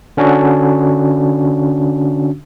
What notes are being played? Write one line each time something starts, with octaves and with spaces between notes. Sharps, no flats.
D3 C#4 D4 F#4